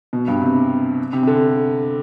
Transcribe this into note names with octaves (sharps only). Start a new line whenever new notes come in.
B2
G2
C3
C3
C3
D3